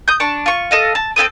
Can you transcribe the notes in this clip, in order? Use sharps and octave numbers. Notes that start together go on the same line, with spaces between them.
D#6 G6
D4 A5 C#6
F4 C#6
A4 D#5 F5
A5
C4 E4 A4 D#6